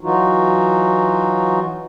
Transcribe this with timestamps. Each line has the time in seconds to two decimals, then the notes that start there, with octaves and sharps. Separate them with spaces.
0.01 E3 F#3 D#4 F4 F#4